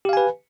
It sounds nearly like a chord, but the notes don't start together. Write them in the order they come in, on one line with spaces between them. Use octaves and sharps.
G4 F5 G#5 B4